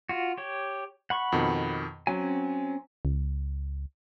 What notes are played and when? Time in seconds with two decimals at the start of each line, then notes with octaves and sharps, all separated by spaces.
0.09 F4 F#4
0.38 G4 C#5
1.10 F#5 B5 C#6
1.32 F2 B2 D#3
2.07 F#3 C4 C#4 G#5
3.05 C#2